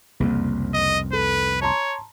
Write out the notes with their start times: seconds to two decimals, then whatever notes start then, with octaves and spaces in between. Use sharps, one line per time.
0.20 F#1 C2 F2
0.74 D#5
1.13 A4 B4
1.61 C#5 A5 A#5 C6